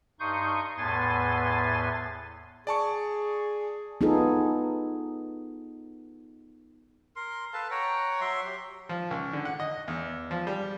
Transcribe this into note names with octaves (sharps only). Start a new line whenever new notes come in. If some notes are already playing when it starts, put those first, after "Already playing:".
G2 D#4 C6 C#6 D#6 G6
E2 A2 B3 G#5 C6 A6
G#4 D5 A5 C#6
B3 D#4 F4 G#4 A4
A#4 C6
A4 B4 F5 A5
C#5 F#5 G5 A#5
F#3 E5 C6
G4
F3
C#2
D3
F#5
D#5
E2
F3
G3